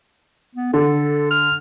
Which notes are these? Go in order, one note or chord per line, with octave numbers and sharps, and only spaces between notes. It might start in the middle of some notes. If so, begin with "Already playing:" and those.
B3
D3 A4
F6